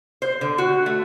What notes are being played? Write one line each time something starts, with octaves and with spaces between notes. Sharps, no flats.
C5
D3
F#4
A3